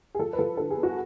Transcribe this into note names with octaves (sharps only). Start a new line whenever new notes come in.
G#4
F3 A4
B4
F3 A4
D3 A4
G#4
B3
F#4